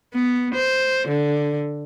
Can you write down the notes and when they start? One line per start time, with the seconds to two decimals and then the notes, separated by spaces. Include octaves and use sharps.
0.14 B3
0.54 C5
1.08 D3